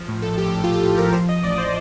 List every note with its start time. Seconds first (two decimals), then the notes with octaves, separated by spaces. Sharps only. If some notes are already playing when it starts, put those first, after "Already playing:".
Already playing: F3
0.08 A2
0.22 A#1 A4
0.38 F3 G4
0.53 A#1 G4
0.64 F4
0.68 A#1 G4
0.83 A#1 A4
0.98 F3 A#4
1.13 F3 C5
1.29 F3 D#5
1.43 A1 D5
1.58 C5